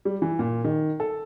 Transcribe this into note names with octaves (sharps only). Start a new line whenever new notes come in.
G3
E3
A#2
D#3
A4